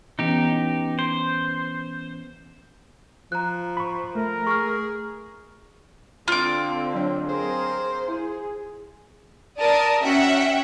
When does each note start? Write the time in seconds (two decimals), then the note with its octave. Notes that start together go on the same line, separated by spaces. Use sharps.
0.19 E3 B3 C#4 D#4 G4
0.99 C5
3.32 F3 A#5 F#6
3.77 B5 C#6
4.15 A3 A#4
4.47 G#4 C#6 F6
6.28 D3 C4 F4 D6
6.94 F#3 D4 C#5
7.29 C4 G#4 A#4 C5
8.08 E4 G#4
9.59 A#4 D5 A5 D#6
10.04 C#4 F#4 E5 F#5 G5